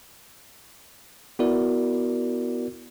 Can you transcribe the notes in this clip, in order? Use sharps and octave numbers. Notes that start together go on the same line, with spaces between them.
B3 E4 F#4 A#4 D5